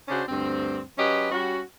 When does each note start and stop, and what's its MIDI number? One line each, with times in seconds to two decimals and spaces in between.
0.08 0.22 49
0.08 0.22 61
0.08 0.22 62
0.08 0.22 66
0.08 0.22 72
0.29 0.81 38
0.29 0.81 43
0.29 0.81 60
0.98 1.29 54
0.98 1.29 61
0.98 1.29 67
0.98 1.29 71
0.98 1.29 75
1.32 1.62 55
1.32 1.62 61
1.32 1.62 66